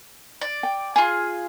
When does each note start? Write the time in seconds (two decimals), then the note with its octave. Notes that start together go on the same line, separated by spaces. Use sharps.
0.41 D5
0.63 G5
0.96 F4 G#4 G#5